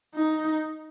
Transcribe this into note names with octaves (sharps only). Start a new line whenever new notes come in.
D#4